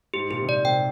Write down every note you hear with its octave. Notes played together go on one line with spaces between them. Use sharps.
G#2 G4
A#2 G4
C3
A#2 D5
C3 G5